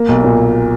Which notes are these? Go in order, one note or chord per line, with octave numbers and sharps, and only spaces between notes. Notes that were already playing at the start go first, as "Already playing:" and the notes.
Already playing: A#3
B1
A#2